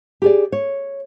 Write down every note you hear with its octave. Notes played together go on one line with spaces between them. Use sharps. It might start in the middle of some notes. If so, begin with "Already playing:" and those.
G4 G#4 D5
C#5